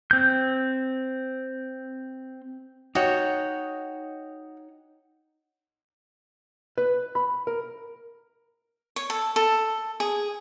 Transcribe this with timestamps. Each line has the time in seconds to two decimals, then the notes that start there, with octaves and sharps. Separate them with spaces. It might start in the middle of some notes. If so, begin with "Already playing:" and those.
0.11 C4 G6
2.95 D#4 F#4 C#5 D#5 G5
6.78 B4
7.15 B5
7.47 A#4
8.96 C#5
9.10 A4
9.36 A4
10.00 G#4